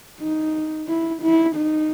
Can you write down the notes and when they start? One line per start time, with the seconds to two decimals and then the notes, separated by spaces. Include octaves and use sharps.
0.20 D#4
0.88 E4
1.22 E4
1.56 D#4